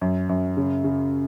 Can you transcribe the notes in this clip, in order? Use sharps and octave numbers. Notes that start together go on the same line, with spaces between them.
F#2
F#2
C#3
C#3